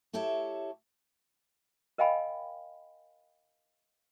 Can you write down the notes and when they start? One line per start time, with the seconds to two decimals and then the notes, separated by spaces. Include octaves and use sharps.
0.13 E4 G4 A4 C#5 E5
1.98 A#4 D#5 F5 G5 G#5 B5